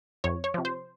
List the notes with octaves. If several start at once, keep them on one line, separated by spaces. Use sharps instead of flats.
F2 C#5
C#5
C3 F3
C5